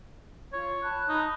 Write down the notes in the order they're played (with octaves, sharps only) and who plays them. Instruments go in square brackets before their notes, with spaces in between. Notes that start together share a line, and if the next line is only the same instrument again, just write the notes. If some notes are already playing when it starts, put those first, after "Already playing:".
[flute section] F4 [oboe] C#5
[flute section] A5 B5 F#6
[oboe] D#4